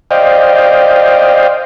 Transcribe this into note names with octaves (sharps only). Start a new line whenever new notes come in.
C5 D5 D#5 F5 G5